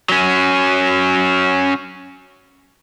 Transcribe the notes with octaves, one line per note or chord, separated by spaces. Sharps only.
F#3 C#4